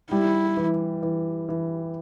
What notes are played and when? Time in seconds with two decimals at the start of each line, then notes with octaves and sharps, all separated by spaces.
0.11 G3 E4
0.57 E3
1.02 E3
1.49 E3